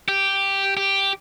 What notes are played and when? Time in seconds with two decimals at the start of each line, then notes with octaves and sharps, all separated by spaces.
0.08 G4
0.77 G4